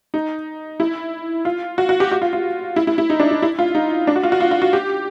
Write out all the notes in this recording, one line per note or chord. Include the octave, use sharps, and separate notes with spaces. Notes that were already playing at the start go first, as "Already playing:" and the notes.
D#4
E4
F4
F#4
F#4
G4
F#4
F4
F4
E4
E4
E4
D#4
D4
D#4
E4
F4
D#4
D4
F#4
F4
F#4
F4
F4
F#4
G4